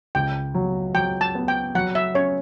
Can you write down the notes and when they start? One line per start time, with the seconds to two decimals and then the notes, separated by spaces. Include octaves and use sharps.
0.15 C#2 G5
0.54 F#3
0.94 F#3 G5
1.21 A5
1.35 B3
1.48 G5
1.75 F#3 F#5
1.95 E5
2.14 C#4 C#5